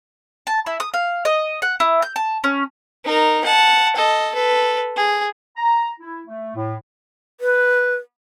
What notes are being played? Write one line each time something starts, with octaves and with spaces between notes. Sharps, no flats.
A5
E4
D#6
F5
D#5
F#5
E4
G6
A5
C#4
D#4 A#4
F#5 A5
A4 D#5
A4 B4
G#4
A#5
E4
A3
A2
B4